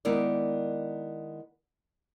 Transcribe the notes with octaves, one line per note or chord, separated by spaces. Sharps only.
D#3 G#3 B3 E4 A#4 D5